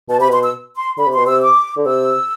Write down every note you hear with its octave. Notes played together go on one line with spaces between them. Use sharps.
B2 A5
C3 B5
B2 C6
E6
C6
D3 B5
C3
B2 C6
C3 E6
D6
D3
C3 E6